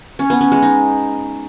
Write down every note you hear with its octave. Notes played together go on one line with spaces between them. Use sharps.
C#4
B3
C#4
G#3
D#4